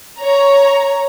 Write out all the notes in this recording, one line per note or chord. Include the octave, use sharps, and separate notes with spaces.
C#5 A#5